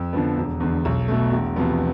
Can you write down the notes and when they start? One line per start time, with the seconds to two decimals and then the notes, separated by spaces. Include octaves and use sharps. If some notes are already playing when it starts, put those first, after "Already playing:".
Already playing: F2
0.13 D3 F3 B3
0.37 E1
0.60 E2 D3
0.85 B1
1.08 B2 A3
1.32 E1
1.56 E2 C3 F3 B3